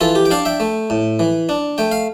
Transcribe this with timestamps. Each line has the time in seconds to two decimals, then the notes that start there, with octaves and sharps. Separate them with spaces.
0.01 E3 F4 A4
0.15 G4
0.25 G5
0.31 D4 D5 F5
0.45 E5 G5
0.60 A3
0.90 A2
1.19 E3
1.49 D4
1.78 A3 G5
1.91 F5